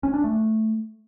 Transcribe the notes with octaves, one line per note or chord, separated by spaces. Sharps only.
C#4
D4
A3